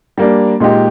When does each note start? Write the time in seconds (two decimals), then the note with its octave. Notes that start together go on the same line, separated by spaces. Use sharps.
0.18 G3 A#3 D4
0.60 A#2 G#3 D#4 G4